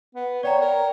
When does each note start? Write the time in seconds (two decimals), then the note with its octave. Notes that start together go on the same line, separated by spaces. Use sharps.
0.15 B3
0.43 C#5 D5 G5 A#5
0.61 A#4